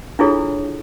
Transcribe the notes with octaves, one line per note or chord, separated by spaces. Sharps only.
D4 E4 F4 G#4 A4 C#5